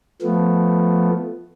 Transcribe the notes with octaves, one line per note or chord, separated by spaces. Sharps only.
F3 A3 B3